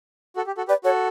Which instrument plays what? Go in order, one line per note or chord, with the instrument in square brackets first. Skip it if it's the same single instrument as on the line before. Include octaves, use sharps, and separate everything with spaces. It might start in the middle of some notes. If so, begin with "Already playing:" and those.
[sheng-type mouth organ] F#4 A4
G4
F#4 A4
[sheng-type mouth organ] G4 B4 [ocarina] D5
[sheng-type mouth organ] F#4 A4 [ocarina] C#5